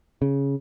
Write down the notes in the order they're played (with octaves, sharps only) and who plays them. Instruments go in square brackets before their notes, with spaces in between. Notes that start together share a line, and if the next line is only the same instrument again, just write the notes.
[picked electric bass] C#3